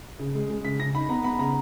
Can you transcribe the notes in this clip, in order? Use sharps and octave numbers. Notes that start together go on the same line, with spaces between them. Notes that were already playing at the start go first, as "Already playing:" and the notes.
C#3
G#3
G#3
C#3 B6
C#3 A#6
D#4 B5
B3 A#5
B3 B5
C#3 A#5